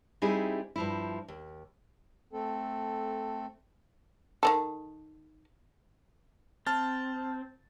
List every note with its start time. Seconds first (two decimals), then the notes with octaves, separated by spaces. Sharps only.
0.22 G3 C4 D#4 E4 G4 G#4
0.76 G2 F3 E4
1.28 D#2
2.33 A3 C4 A4
4.43 D#3 E3 A4
6.67 C4 A5 F6 A6